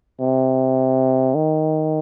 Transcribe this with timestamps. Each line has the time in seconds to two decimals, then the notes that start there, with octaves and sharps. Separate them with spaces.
0.20 C3
1.35 D#3